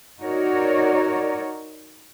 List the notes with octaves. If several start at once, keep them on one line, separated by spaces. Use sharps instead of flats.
D#4 F#4 A#4 C#5 D5